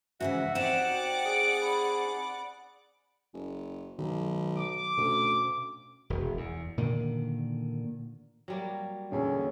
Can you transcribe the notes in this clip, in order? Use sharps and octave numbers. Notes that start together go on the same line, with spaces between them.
G#2 C#3 E3 F#4 E5
C4 D#4 G4 D5 F#5 D6 E7
G5
G#4 D7
B5
F#1
B1 D#3 F#3
D6
D2 B2 C#4
E1
E2
A#2 D3 D#3
F#3 G3 A#3
B1 E2 A#2 D3 C#4